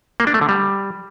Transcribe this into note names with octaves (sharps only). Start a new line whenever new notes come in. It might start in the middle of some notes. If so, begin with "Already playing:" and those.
A#3
D4
A3
D3
G3